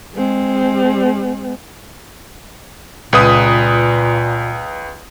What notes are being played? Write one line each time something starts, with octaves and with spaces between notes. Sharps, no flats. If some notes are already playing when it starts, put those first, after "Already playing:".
G#3 C4
C#2 A#2 B4 D#6